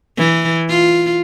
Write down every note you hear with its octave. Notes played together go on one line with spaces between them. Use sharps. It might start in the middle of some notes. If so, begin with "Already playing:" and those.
E3
F4